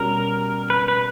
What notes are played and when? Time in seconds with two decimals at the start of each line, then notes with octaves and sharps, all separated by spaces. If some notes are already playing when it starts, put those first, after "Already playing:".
Already playing: B2 G3 C#4 A#4
0.70 B4
0.88 B4